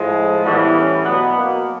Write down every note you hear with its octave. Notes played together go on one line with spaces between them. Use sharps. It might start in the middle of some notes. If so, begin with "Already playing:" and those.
Already playing: A2 F3 G#3
A2 E3 G3 B3
C#4
B2 F#3 B3
A#3